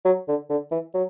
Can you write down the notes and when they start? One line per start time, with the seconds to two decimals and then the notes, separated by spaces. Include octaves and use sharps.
0.05 F#3
0.29 D3
0.50 D3
0.72 E3
0.94 F#3